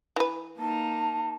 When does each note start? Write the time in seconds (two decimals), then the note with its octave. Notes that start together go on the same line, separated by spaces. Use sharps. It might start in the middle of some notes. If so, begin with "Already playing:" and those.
0.16 E3 B4
0.58 A#3 D#4 A5